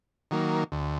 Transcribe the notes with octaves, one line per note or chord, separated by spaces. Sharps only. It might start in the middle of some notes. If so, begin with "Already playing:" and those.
D#3 F#3 A#3
D2